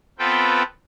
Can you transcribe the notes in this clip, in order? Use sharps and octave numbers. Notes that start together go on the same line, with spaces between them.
B3 C4 F4 A4 B4 G5